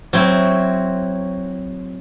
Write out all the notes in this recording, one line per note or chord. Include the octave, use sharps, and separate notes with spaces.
F#3 C4 E4 F#4